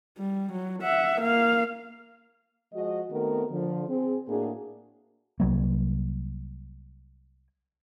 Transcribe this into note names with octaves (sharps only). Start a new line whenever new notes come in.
G3
F#3
E5 F#5
A#3 F5
F3 G#3 F#4 D#5
D#3 A3 B3 C4 F#4 A#4
D3 F3
C4 G#4
A2 A#3 D4 F#4 G#4
C2 F#3 A#3